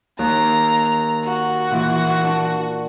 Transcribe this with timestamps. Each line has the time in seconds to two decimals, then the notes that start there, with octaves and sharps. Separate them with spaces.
0.19 D#2 A#5
1.24 F#4
1.71 A#2 E3
2.24 D4